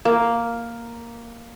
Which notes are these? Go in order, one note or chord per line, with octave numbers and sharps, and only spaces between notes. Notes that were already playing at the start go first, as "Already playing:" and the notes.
A#3